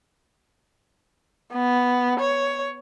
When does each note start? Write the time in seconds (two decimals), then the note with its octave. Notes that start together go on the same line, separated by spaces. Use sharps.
1.53 B3
2.20 C#5